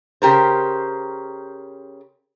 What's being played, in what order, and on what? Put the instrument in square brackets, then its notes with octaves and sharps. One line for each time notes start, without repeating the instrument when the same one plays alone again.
[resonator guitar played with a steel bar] C#3 G4 A#4 C5